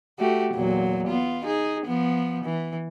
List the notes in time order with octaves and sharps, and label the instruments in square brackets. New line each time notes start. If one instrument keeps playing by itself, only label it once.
[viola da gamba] A3 F#4 G4
E2 A#2 F#3
B3 F4
D#4 G#4
F3 B3
E3